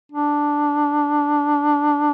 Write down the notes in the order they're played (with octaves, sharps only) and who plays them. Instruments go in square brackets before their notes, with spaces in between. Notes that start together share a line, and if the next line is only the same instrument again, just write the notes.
[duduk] D4